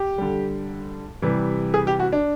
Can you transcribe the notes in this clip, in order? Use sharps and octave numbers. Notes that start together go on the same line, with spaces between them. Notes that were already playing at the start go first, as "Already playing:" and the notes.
Already playing: G4
D3 G3
C3 E3 G3
G#4
G4
F#4
D4